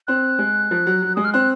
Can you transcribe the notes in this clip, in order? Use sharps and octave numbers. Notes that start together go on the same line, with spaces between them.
C4 F#6
G#3
F3
F#3
F#3
G#3 D#6
F6
C4 F#6